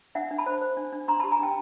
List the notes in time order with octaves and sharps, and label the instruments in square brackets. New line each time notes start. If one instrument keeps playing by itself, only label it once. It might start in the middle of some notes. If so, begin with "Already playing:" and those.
[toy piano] D4 E5 F#5
D4
A5 B5
C5
C5
D4
D4
D4 A#5 C6
A5 B5
G4
G#5 A#5
D4 G5 A5